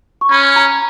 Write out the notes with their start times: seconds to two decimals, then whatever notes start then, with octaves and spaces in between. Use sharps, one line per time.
0.21 C#6
0.31 C#4 B5
0.56 A#5